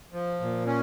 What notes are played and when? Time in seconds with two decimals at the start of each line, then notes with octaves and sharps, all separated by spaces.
0.13 F3
0.40 A#2
0.66 C#4